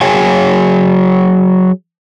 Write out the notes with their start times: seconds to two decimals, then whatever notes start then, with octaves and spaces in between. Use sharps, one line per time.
0.01 F#3 G#4 C#5 G5 G#5